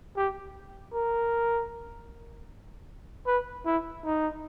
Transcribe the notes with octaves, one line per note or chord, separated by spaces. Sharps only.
G4
A#4
B4
E4
D#4